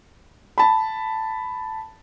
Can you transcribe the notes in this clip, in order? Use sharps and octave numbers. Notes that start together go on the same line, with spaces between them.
A5 B5